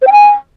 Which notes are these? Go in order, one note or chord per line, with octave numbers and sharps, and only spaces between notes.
C5
G5
G#5